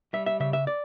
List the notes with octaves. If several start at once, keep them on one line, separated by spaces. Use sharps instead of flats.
G3 E5
E5
C#3 E5
E5
D5